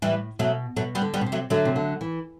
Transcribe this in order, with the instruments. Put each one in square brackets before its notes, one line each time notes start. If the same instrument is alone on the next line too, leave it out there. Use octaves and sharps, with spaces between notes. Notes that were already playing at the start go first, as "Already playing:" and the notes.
[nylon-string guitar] A2 [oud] E3 G3
[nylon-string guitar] B2 [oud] F#3 A3
[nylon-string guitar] B2 [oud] F#3 A3
[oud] G3 B3
[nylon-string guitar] D3
[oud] G3 B3
[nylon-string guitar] B2
C3
[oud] F#3 A3
[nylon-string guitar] D3 [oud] F#3 A3
[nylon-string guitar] C3
D3
E3